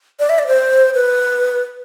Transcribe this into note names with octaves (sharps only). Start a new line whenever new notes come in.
D5
E5
D5
C5
B4